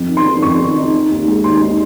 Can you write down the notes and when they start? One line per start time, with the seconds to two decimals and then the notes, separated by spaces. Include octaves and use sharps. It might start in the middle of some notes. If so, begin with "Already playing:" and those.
Already playing: F2
0.09 D#3
0.17 C6
0.26 D#3
0.42 F2 C#6
0.60 D#3
0.77 D#4
0.94 D#4
1.11 D#2
1.28 G#3
1.44 D#2 C6
1.61 D#4